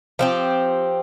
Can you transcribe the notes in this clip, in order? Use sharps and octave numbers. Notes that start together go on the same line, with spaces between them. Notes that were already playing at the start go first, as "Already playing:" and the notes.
F3 C4 G4